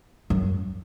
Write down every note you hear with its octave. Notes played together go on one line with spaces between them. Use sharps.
F#2